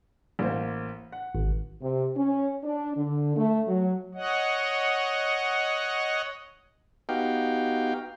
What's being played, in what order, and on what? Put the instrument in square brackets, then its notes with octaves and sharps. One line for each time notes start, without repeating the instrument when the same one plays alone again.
[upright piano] A1 A#3 C5
F#5
[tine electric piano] G#1
[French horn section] C3
C#4
D4
D3
A3
F#3
[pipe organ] C#5 D#5 F#5
[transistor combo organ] B3 D#4 F#4 G4 F5 G5